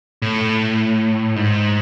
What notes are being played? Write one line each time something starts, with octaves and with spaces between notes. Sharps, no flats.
A2
G#2